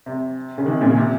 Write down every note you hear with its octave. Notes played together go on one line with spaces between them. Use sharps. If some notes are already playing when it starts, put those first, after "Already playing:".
C3
C#3
C3 D#3
A#2 C#3
C3